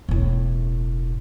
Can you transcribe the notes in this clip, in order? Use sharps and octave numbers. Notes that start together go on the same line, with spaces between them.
E1 A2